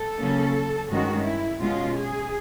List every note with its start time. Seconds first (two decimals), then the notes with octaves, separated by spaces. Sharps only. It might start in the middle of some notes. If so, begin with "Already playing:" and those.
Already playing: A4
0.20 C#3 F#3 A#3 C#4
0.90 G2 D#3 G#3 C#4 F#4
1.25 E4
1.60 B2 G#3 C#4 F4
1.95 G#4